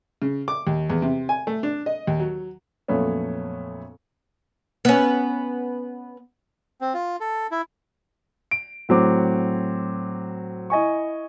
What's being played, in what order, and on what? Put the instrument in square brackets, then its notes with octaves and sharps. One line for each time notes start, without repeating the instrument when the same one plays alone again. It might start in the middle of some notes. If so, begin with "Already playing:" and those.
[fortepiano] C#3
D6
D#2
E2
C3
G#5
A3
D4
D#5
D#2
F#3
[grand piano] F2 A#2 F#3 A3 B3 C#4
[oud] B3 C#4
[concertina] C4
F4
A4
E4
[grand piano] D7
A2 F#3 C4 D6
E4 D#5 G#5 C#6